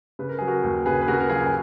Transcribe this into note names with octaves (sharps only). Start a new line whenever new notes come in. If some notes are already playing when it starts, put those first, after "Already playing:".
C#3 B4
A#4
F#3 G#4
F#4 A#4
D#2
C#3 G#4 B4
B4
C#3 F#4 A#4
A#4
F#3 F4 G#4
G#4